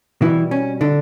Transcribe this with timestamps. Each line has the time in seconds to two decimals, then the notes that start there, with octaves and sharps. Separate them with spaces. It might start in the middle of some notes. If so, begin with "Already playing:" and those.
0.21 B2 E3 G3 E4
0.51 C#4
0.81 D3 D4